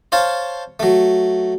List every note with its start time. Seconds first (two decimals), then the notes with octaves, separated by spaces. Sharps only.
0.12 C5 C#5 F5 A5
0.80 F#3 A3